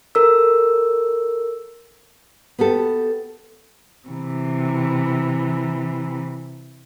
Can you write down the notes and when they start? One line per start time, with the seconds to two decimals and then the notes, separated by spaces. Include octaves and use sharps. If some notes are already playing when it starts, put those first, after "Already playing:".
0.15 A4 A#4 E6
2.59 B3 F#4 G4 A4
4.08 C3 E3